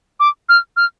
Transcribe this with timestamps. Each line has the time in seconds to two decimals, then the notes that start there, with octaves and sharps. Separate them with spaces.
0.20 D6
0.49 F6
0.77 F6